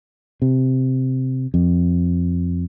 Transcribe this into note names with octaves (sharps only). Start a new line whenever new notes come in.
C3
F2